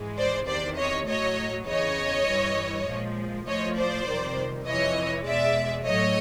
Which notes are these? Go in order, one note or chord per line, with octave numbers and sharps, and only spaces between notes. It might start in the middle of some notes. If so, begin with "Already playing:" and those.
Already playing: G#2 E3 G#3
C5 D5
E2 C3 D#3 C5 D5
C#5 D#5
A2 F#3 A3 C#5 D#5
E2 C#3 E3 C#5 D#5
G2 E3 G3
A#2 F3 G#3
A2 F3 A3 C#5 D#5
C5 D5
F2 C3 D#3 G3
F2 C3 E3 C#5 D#5
E2 B2 G#3 D5 E5
A2 F#3 A3 C#5 D#5